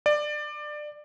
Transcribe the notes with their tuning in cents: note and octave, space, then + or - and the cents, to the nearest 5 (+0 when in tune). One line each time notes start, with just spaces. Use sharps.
D5 +20